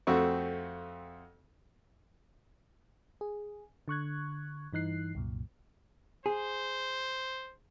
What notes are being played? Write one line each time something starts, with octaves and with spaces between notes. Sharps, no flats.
F2 A3 C4 F#4 C#6
G#4
D3 C#6 F#6 G#6
G2 E3 D#4 F#6 C7
C2 F#2 A#2
G#4 C5